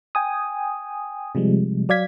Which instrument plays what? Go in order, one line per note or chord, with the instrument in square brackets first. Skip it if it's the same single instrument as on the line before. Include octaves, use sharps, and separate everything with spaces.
[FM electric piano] G5 G#5 D#6
C3 F3 G3 G#3
F#3 D5 F5 G#6 B6